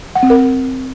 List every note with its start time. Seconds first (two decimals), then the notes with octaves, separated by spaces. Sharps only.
0.15 F#5
0.23 C4
0.30 A#4